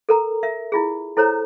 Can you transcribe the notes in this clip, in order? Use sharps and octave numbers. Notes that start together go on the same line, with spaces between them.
A4 A#4 A#5
A#4 E5
E4 F4 G#4
E4 A4 C5 C#5 A#5